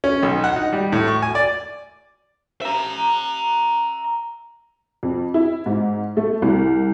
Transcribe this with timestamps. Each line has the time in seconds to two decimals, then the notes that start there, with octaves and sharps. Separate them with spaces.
0.04 C#4
0.23 B1
0.44 F#5
0.56 D#4
0.73 G3
0.93 A2
1.08 C#6
1.22 G#5
1.35 D5
2.62 E5 A#5
5.03 F2
5.34 E4
5.66 G#2
6.17 A3
6.42 C2